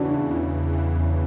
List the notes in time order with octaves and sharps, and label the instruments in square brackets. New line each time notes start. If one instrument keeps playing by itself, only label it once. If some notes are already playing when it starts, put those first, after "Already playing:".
Already playing: [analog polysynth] E2 C#3 E3 [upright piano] C#4 D4 F#4
[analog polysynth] C#3 [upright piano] D4
[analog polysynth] C#3 [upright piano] E4
[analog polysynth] E2
E3
E2